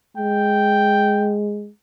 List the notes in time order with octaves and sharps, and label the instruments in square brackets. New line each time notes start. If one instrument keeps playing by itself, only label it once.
[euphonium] G#3 [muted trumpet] G5